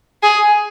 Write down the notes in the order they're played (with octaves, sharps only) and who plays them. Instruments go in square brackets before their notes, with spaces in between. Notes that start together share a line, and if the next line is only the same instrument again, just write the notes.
[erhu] G#4